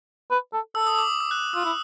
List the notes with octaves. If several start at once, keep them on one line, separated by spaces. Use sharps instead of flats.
B4
A4
A4 E6
D#6
D6
E6
F#6
F4 E6
E4